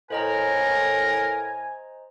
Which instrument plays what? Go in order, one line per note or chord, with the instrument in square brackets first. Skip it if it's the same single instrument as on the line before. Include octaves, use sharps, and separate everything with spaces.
[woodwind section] A2 [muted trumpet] A#4 [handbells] C5 D#5 A#5 [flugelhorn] G#5